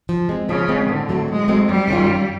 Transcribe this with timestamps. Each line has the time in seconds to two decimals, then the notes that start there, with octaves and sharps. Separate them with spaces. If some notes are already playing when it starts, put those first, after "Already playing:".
0.09 F3
0.29 G#3 C4
0.49 C#3 F3
0.69 G#3 C4
0.89 A2 D3
1.09 F#3 A3 C4
1.28 A2 G#3
1.48 F#3 A3 C4
1.68 F#2 G3
1.88 D#3 G#3 C#4 F4
2.08 F#2